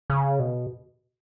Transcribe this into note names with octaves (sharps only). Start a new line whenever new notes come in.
C#3
B2